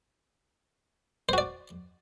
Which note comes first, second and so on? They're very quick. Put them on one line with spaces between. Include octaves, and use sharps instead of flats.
C5 F#4 D5